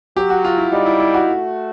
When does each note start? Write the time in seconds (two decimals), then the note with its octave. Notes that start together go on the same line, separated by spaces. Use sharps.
0.16 F#3 G4
0.30 F#4
0.45 F4
0.58 E4
0.72 G3 D#4
0.86 E4
1.00 E4
1.14 F#4
1.28 A3